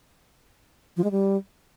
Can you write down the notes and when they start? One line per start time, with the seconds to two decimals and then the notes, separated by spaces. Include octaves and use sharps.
0.97 F3
1.04 G#3
1.11 G3